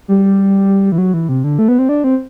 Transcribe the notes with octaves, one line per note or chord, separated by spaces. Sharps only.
G3
E3
F#3
E3
C3
D3
A3
B3
C4
D4
C4